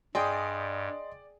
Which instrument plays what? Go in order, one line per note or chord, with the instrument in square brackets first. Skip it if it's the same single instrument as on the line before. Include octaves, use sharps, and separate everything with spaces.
[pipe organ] G2 [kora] G#4 G5 [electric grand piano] D5 [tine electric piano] D#5 C6